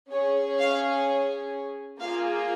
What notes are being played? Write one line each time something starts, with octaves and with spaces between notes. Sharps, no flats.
C#4 G#4 C#5
F5
A#3 F4 G#4 F5